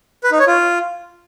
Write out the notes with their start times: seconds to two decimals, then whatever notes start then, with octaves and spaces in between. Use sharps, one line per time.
0.24 B4
0.31 D#4
0.39 C#5
0.47 F4